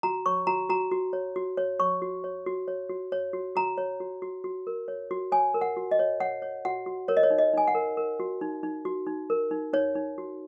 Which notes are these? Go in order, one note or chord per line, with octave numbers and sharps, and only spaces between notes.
F#4 A#5
C#5 C#6
F#4 A#5
F#4 A#5
F#4
C#5
F#4
C#5
C#5 C#6
F#4
C#5
F#4
C#5
F#4
C#5
F#4
F#4 A#5
C#5
F#4
F#4
F#4
A#4
C#5
F#4
C#5 G#5
A#4
F#5
F#4
D#5
C#5
C#5 F#5
C#5
F#4 F#5
F#4
A#4 C#5
D#5
C#5
D#4
D#5
D#4 G#5
F#5
A#4
A#4
F#4
D#4
D#4
F#4
D#4
A#4
D#4
D#4 C#5
D#4
F#4